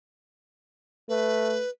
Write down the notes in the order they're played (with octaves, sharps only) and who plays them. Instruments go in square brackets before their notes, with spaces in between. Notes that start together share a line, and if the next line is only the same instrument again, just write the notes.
[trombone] A3 [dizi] B4